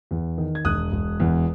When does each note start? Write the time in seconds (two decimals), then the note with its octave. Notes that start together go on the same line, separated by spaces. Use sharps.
0.11 E2
0.38 D#3
0.55 G#6
0.65 E1 D#6 F#6
0.92 E1
1.20 E2